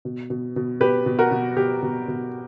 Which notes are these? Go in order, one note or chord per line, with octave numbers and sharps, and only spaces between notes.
B2
B2
B2
B2 G4 B4
B2
F#4 A#4
B2
B2 G4
B2
B2